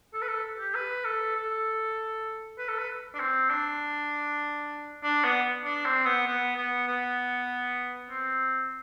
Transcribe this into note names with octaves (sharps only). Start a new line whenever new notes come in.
A4
B4
A4
G4
B4
A4
A4
B4
A4
B4
D4
C4
D4
D4
B3
D4
C4
B3
B3
B3
B3
C4